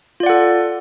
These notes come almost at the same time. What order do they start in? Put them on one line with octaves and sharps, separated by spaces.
F4 D5 F#5 A4